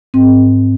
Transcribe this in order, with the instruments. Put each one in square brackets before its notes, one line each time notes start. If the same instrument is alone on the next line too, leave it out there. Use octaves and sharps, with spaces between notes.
[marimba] G#2 C4